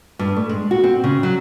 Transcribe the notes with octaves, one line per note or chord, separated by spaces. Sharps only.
G2
A3
G#3
F#4
C4
C#3
F#3